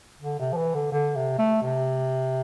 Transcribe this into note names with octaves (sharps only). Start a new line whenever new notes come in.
D3
C3
F3
E3
D3
D3
C3
A3
C3